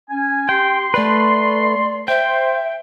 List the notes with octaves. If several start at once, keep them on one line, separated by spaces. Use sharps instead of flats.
C#4 G#5
G4 G5 C6
A3 B4 D5
C5 E5 G5